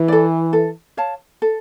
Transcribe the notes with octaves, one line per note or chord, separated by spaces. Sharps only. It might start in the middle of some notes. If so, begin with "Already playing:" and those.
Already playing: E3
A4 D5
A4
C#5 F5 A5
A4